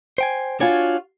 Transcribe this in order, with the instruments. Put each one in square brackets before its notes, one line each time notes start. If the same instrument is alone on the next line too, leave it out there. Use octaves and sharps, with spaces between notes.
[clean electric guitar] C5 G5 G#5
[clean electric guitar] D4 C#5 G#5 [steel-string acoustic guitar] F4 F#4